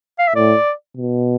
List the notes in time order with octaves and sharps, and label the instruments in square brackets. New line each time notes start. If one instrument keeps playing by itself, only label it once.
[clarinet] F5
E5
[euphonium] A2 [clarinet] D5
[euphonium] B2